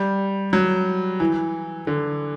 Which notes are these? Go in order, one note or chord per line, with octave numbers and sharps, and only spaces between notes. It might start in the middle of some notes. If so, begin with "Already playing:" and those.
Already playing: G3
F#3
E3
D3